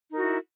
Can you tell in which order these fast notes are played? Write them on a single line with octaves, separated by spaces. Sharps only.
D#4 A#4 F#4 E4